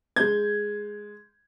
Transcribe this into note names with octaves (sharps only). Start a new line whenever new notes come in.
G#3 G6 G#6